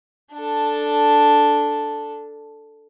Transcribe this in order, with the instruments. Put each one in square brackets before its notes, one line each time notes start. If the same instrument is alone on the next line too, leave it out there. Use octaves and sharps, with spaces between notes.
[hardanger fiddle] D4 A4